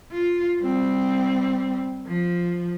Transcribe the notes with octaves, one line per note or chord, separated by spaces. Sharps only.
F4
G3 C4
F3